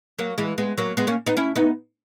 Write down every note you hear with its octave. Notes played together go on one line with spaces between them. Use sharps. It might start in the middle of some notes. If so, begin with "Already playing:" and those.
F#3 A#3
E3 G#3
G#3 B3
F#3 A#3
G#3 B3
A#3 C#4
B3 D#4
C#4 E4
B3 D#4